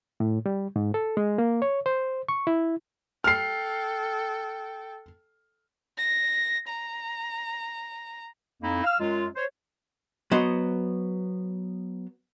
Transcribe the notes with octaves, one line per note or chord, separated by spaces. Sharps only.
A2
G3
G#2
A4
G#3
A#3
C#5
C5
C#6
E4
A4 G5 F6 C7
A#6
A#5
F2 A#3 D#4 E4
F5 E6 F6
F#2 F#3 G#3 F4
C5 C#5
F#3 B3 C5 D#5